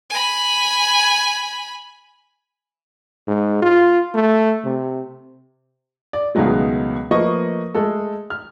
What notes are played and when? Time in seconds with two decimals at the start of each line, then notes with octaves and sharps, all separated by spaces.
0.10 G#5 B5
3.28 G#2
3.62 F4
4.15 A3
4.65 C3
6.13 D5
6.35 C#2 B2 D#3 F#3 G#3 A3
7.11 F3 A3 A#3 B4 D#5 C#6
7.74 G#3 A3 A4
8.30 F6